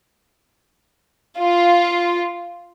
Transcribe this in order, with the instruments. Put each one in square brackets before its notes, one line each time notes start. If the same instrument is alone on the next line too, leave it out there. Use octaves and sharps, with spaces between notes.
[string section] F4